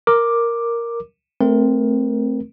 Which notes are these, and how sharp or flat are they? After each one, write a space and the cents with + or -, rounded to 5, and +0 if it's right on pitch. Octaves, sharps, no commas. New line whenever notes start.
A#4 +0 D6 +5
A3 +0 C4 +0 A#4 +20